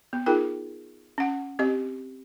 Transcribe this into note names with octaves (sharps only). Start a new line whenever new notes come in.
B3
D#4 F4 G#4 A#4 G5
C#4 F#5
C4 G4 D#5